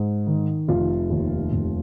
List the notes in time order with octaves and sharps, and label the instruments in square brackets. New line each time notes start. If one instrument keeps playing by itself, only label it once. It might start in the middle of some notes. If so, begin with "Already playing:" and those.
Already playing: [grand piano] G#2
D#3
F1 F4
D#2
F1